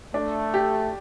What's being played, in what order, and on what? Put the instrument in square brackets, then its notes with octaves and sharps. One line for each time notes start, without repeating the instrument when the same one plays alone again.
[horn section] A3 [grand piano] D4
[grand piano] G4